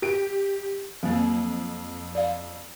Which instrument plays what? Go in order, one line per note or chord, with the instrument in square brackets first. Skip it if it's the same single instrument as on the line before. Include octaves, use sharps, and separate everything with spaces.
[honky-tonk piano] G4 D7
[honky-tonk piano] F2 [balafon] F#3 A#3
[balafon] D5 F5